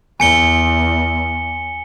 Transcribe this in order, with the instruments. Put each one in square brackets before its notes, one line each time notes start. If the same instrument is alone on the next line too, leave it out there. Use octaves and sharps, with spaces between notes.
[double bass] E2 [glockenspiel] G#5 C#7 G7